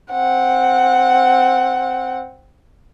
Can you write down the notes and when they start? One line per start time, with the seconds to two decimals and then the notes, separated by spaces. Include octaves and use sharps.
0.11 C4 F#5